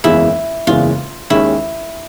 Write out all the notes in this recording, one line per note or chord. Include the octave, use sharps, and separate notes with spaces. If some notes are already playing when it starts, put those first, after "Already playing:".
F#1 E2 C#3 E3 G#3 E4
F#1 E2 C#3 E3 G#3 F4
D#2 D#3 G#3 C#4 E4